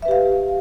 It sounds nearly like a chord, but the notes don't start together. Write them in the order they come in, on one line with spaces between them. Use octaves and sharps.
E5 B4 G4 F5